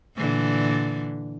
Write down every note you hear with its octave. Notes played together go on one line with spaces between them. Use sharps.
A#2 D3 E3